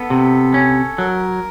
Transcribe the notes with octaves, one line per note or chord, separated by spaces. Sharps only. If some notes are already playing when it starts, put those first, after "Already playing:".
Already playing: B3 A4
C3
C#4
F#3 A#4